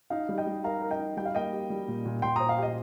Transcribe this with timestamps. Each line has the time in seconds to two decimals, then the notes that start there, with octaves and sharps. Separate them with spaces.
0.10 D#4 F5
0.29 G3
0.38 D#5 G5
0.47 G3
0.64 A#4 F5 A#5
0.82 A#4
0.90 D#5 G5
0.99 D#4
1.17 G3 G5
1.25 F5
1.35 A#3 D#5 G5
1.52 G4
1.70 G3
1.88 A#2
2.05 A#2
2.22 A#2 G5 C6
2.36 C5 A#5 D#6
2.49 F5
2.58 G4 D#5